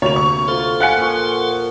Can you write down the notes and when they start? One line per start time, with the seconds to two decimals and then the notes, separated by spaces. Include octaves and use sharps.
0.02 D2 C3 A#3 C#5 F7
0.16 C#6
0.48 F4 A4 C5
0.80 F5 F#5 G#5 F#6 C#7
0.97 A#2 F3 C#6